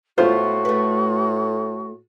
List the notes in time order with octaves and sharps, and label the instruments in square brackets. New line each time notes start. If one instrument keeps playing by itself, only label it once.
[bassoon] A2 [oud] A3 B3 [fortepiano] F4 C5 [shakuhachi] F#4
[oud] A3 B4